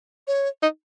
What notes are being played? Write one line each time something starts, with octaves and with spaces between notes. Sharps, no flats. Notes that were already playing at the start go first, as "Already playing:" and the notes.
C#5
D#4